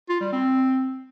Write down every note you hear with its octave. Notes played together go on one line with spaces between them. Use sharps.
F4
G3
C4